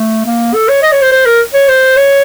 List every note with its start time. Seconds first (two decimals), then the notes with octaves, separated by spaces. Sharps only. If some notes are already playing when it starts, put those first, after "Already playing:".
Already playing: A3
0.26 A#3
0.54 A4
0.69 C#5
0.83 D#5
0.92 C#5
1.02 C5
1.12 C5
1.26 A#4
1.54 C#5
1.68 C5
1.97 C#5